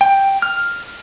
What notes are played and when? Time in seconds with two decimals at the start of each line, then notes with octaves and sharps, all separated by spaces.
0.01 G5
0.42 F6